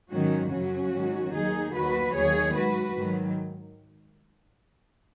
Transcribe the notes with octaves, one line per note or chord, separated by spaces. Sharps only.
G#2 D#3 F#3 C#4 F#4
F#2 C#3 F#3 C#4 F#4
G#2 D#3 F#3
D#2 D#3 F#3 D#4 G#4
D#2 D#3 F#3 F#4 B4
D#2 D#3 F#3 G#4 C#5
G#2 F#3 F#4 B4
G#2 D#3 F#3